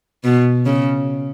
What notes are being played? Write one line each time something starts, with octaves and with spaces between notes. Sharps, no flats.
B2
C#3